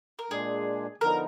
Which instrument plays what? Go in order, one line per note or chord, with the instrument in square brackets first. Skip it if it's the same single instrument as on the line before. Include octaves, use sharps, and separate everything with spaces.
[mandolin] A#4
[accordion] A#2 G#3 D4 [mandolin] G#4
[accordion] D3 F3 B3 D#4 [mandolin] A#4